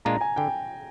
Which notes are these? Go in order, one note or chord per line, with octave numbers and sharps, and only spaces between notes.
A#2 G#3 D4 F4 A#5
G#5
D3 G5